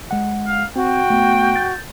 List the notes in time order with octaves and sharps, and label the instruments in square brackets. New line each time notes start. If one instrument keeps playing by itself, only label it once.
[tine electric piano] G#3 F#5
[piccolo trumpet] F5
[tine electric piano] C4 [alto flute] F#4 [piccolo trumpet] G5
[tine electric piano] A3 B3
G6 A6